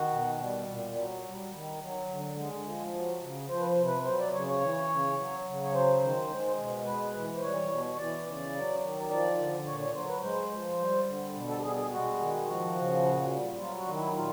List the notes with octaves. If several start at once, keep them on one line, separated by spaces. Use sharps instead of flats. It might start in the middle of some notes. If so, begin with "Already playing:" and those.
Already playing: D#3 F#4
B2
G3
A#2
F#3
G3
D#3
F#3
D3
G#3
F3
F#3
C#3
F3 C5
B4
C5
C3
B4
F#3 C5
D5
C#3 C#5
C#5
E3
C#3
F#3
C#3
C#5
F#3 C5
D#3
G#3
B2
G#3 B4
E3
C5
G3 C#5
B2
C#5
E3 D5
C#3
F#3
D#3
F3 D5
D3
A#2 C#5
C#5
F#3 C5
B4
G#3 C5
F3
G3
D3
B2
A4
G4
G3 G#4
G#4
G#3 F#4
D#3
F3 F#4
C#3
A#2
G3
F#3 F4
F#4
D#3
E4
A#2 F4